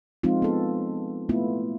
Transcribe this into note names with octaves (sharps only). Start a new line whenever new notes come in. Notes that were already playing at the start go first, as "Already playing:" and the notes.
F3 G#3 C4 D#4 F4
B3 A4
A3 B3 E4 F4